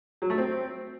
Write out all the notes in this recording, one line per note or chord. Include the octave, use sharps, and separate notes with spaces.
F#3
A3
C4